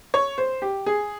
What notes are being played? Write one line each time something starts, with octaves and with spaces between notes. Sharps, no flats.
C#5
C5
G4
G#4